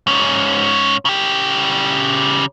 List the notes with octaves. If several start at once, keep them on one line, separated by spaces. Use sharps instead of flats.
G#2 C#4
C#3 G4